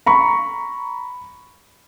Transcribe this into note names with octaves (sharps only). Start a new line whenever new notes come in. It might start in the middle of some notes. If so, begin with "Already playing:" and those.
A#5 B5 C#6